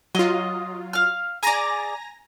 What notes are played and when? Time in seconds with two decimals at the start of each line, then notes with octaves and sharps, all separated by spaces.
0.15 F#3 F4 D#5
0.93 F5 F6
1.43 G#4 D5 G#5 A#5 A#6